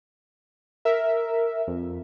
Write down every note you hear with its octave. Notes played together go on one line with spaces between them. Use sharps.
A#4 E5
F2